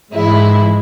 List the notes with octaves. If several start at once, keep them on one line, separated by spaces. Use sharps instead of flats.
G#2 E3 G#3 E4